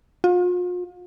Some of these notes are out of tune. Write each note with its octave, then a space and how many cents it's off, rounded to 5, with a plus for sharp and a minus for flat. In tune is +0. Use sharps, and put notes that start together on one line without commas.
F4 +40